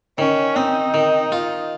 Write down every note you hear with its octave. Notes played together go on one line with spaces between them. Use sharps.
D#3 C#4
C4 D#4
D#3
F4